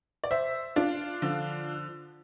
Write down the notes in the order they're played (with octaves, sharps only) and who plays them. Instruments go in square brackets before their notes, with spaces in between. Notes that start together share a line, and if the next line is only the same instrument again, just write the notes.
[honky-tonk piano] D5
C5 E5
D4 F4
D3 F3